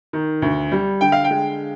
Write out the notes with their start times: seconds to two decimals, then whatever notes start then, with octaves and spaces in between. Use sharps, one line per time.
0.13 D#3
0.42 D2
0.72 G3
1.01 D3 G5
1.12 F5
1.24 G5
1.31 G#3